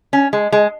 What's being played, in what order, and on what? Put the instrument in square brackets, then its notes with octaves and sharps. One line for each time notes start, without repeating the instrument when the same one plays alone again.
[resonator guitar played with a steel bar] C#4
G#3
G#3